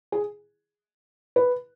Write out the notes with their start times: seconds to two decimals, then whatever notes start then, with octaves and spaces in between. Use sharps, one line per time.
0.12 G#4
1.36 B4